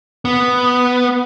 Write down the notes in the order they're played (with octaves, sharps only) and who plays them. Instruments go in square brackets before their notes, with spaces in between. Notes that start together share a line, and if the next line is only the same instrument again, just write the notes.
[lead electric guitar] B3